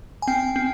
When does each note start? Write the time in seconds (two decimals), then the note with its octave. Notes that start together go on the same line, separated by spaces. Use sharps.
0.22 G#5
0.28 C4 G5
0.56 C4